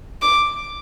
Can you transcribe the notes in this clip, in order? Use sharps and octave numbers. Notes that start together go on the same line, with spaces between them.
D6